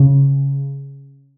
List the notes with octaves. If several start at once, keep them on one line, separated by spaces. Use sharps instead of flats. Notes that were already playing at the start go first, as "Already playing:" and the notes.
Already playing: C#3